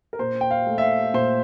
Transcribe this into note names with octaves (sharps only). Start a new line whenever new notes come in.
A#4
A#2 C5
G5
F5
A3
E5
F5
A#2 C5